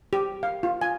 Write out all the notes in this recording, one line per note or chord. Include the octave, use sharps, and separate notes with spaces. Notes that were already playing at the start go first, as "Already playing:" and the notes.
G4
F5
F4
G#5